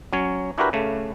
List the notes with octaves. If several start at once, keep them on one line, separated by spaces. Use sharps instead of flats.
F#3 C#4 C#5
D4 E4 F#4 G4 A#4 B4
C#3 A3